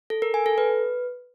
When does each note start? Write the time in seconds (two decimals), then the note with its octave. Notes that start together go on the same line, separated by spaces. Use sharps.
0.10 A4
0.22 A#4
0.34 G#5
0.46 A4
0.58 B4